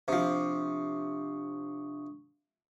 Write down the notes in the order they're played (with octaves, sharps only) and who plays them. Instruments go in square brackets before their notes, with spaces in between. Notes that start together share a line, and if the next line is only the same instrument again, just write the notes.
[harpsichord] C3 F3 [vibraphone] D4 C#6 D#6